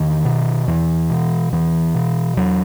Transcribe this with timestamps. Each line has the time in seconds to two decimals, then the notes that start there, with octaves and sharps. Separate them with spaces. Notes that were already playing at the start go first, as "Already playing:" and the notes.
Already playing: E2 D#3
0.25 B2
0.67 E2 E3
1.10 B2
1.52 E2 E3
1.95 B2
2.37 E2 F#3